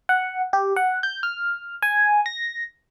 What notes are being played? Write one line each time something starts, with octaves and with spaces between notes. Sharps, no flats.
F#5
G4
F#5
G6
F6
G#5
A#6